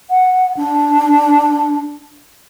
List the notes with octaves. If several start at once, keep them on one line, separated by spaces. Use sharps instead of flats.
F#5
D4